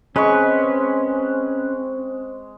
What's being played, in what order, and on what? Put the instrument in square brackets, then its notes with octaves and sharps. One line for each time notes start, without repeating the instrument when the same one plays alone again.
[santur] G#3 C#6 [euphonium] C4 [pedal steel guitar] C#4 B4